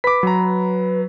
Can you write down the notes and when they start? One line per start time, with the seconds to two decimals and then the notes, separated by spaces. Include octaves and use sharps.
0.04 B4 D6 B6
0.23 F#3 A#5